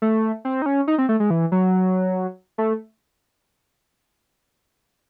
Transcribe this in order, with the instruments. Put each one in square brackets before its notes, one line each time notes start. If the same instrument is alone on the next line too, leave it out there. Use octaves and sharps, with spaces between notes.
[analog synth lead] A3
C4
D#4
C#4
D#4
C4
A3
G#3
E3
F#3
A3